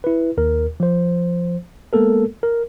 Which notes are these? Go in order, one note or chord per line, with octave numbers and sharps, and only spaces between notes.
E4 B4
D#2 A#4
F3 C5
G#3 A#3 B3 A4 A#4
A#4